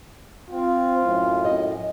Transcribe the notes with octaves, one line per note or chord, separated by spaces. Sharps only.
C4 F4
F#2 A2
D#5